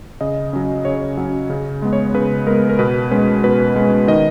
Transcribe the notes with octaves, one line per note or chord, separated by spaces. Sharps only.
C#3 D#5
F#3 C#4
C#3 C#5
F#3 C#4
C#3
G#3 B3
C#5
C#3 B4
G#3 B3 A#4
A#4
B2 B4
G#3 C#4 B4
B2 B4
G#3 C#4
D#3 D#5